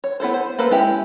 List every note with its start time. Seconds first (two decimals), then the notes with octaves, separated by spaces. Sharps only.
0.04 C#5
0.20 B3 E4 A4 C5
0.34 C5
0.59 A#3 A4 B4 C5
0.71 G#3 C#4 E4 G4